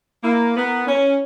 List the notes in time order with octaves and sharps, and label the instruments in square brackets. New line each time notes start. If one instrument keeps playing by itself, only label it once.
[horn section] A#3 [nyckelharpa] E4
[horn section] B3 [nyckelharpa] A#4
[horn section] C#4 [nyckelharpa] C#5